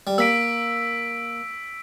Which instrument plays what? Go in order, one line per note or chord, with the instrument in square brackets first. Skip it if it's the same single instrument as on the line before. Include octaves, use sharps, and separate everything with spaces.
[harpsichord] G3
[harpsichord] A#3 [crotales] E6 B6 D7